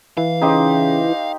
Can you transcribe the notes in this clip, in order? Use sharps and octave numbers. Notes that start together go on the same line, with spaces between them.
E3 F5
C#3 D#4 G4 C5